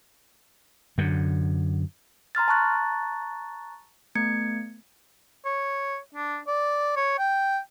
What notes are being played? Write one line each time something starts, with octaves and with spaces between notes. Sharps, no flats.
F#2 D3
A#5 C6 F6 A6
A5 A#5 C#6 F#6 A6
A3 B3 G#6 C#7
C#5
D4
D5
C#5
G5